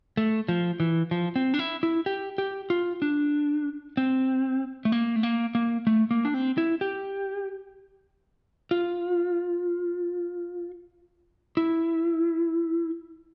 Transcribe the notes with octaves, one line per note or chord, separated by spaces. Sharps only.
A3
F3
E3
F3
C4
D4
E4
E4
G4
G4
F4
D4
C4
A3
A#3
A3
A#3
A#3
A3
A#3
D4
C4
E4
G4
F4
E4